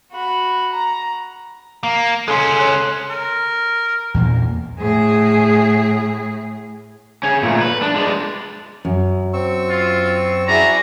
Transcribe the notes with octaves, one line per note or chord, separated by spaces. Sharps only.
F#4 B5
A#5
A#3
G#3 C#4 A4 C6
C#5 C6 F#6
A#4
E2 A#2 A#3
A2 G#4
C#4 G#4
A#2 A3
B4
D4
G#3 D5
F#2
C4 C#6 E6
F4
E4 F#4 G#4 D5 A#5